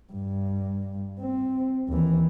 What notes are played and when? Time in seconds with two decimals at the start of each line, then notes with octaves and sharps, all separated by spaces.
0.13 G2
1.20 C4
1.89 D#2 E3